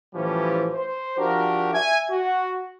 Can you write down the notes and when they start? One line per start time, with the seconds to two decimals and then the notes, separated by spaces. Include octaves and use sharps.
0.15 A2 E3 F3 G3 C#4 G4
0.73 C5
1.18 F3 D4 F#4 G4 A#4
1.74 E5 G#5
2.10 F#4